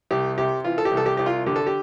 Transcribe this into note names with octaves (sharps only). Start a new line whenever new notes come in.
C2 G4
C3 G4
E3 F4
A4
G4
C2
A4
G4
C2 G4
F4
D3 G4
A4
G4